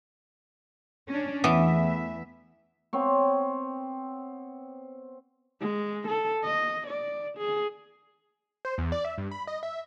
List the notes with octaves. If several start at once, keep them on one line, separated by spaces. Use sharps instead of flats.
C#4 D4
E2 E3 A3 B3 E5
B3 C4 C#5
G#3
A4
D#5
D5
G#4
C5
E2
D5
E5
G2
B5
D#5
E5